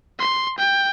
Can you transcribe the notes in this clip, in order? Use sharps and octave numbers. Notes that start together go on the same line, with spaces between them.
C6
G5